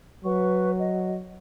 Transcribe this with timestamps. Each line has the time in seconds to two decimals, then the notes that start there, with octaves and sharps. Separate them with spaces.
0.24 F#3 B4 C#6
0.77 D#5